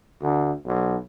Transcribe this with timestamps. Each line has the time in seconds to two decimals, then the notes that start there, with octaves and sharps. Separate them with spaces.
0.21 D2
0.65 B1